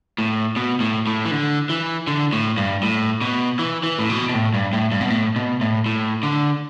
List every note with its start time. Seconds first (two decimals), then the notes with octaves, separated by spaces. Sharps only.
0.18 A2
0.56 B2
0.81 A2
1.07 A2
1.25 E3
1.31 D3
1.70 E3
2.07 D3
2.33 A2
2.58 G2
2.83 A2
3.21 B2
3.59 E3
3.83 E3
3.99 A2
4.10 B2
4.29 B2
4.34 A2
4.54 G2
4.73 A2
4.92 G2
5.01 B2
5.10 A2
5.36 B2
5.61 A2
5.86 A2
6.23 D3